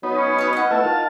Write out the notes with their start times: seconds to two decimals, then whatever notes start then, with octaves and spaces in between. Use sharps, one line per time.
0.03 F#3 B3 D#4
0.16 C#4
0.38 B4 C#5
0.53 D#5 F#5
0.71 A3 B3 E4 A5
0.83 D#3 F4